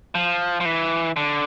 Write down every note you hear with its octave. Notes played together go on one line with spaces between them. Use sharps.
F3
F3
E3
D3